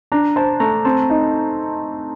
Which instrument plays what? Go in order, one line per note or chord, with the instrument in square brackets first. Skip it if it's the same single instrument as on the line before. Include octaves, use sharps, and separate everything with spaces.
[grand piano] D4 [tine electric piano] A#5
[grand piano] C5 [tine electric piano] A5
[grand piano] A3 [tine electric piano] A#5
[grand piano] C4 [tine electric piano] A5
[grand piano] D#4